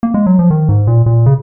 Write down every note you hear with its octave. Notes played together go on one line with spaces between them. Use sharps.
A#3
G#3
F#3
F3
D#3
G#2
A#2
A#2
C#3